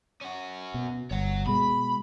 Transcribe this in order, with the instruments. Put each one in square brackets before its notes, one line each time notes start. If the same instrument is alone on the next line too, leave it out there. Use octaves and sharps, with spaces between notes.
[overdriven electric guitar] C#4 F#4
[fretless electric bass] B2
[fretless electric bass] G1 [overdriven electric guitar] C#5 F#5
[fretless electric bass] B2 G#3 [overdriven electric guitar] B5